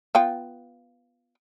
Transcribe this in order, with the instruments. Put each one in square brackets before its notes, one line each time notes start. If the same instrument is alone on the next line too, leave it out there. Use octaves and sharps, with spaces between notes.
[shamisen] B3 F4 G5